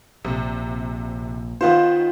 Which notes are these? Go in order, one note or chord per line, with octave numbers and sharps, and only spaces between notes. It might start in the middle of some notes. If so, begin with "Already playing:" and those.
A#1 C3
D#3 B3 F4 C5 F5